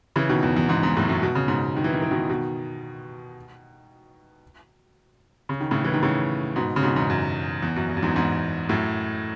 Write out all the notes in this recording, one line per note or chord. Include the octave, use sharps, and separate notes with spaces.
C#3 E3
B2 D#3
E2
E2
E2 G#2
E2 G#2
F#2 A2
F#2 A2
B2
C#3
G#2 B2
D#3
E3
D#3
E3
B2 D#3
B2 D#3
C#3
D#3
A2 C#3
E3
D#3
A2 C#3
G#2 B2
C#3
G#2 B2
E2 G#2
F#2
E2
F#2
E2
F#2
E2 G#2
E2 G#2
F#2 A2